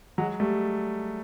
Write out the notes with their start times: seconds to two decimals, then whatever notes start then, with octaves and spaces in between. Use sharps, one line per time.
0.18 F#3 G#3
0.40 G3 A3